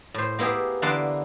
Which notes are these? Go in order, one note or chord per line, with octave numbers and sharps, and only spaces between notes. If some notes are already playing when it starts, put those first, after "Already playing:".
A2 C5
A#3 B3 E4 G4 G#4
D3 E3 A#3 B3 A5 C6